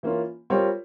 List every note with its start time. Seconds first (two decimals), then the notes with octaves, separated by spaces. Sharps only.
0.03 E3 A#3 C#4 F4
0.50 G3 C4 F4 A#4 C#5